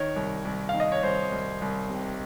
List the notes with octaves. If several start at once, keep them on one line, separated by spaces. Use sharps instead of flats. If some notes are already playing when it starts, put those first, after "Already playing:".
Already playing: D#3 C#5
C2
C2
D#3 F5
D#5
C#5
C2 C5
C2
C2
C3